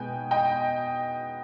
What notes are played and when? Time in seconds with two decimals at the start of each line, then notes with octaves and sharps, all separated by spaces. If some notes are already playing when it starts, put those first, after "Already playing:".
Already playing: B2 G#3 B3 D#4 G5 G#5
0.31 D#5 G5